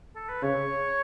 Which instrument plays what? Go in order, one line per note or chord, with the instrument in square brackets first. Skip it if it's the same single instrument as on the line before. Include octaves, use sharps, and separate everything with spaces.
[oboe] A4
B4
[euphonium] C#3 [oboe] C#5